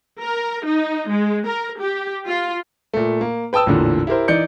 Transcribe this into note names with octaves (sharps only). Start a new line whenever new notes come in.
A#4
D#4
G#3
A#4
G4
F4
A#2 A3
A#3
B4 G5 A5 D#6 E6
A1 E2 A#2 D3
E4 G4 A#4 C5
E3 D#4 D5 G6 C#7